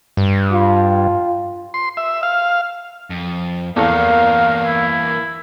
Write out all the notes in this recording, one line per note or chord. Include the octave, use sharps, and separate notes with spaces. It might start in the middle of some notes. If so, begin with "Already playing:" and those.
G2
F4
C6
E5
F5
F2
E2 E3 A#3 A4 A#4 F5
E4